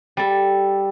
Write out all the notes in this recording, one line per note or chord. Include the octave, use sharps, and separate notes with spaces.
G3 A4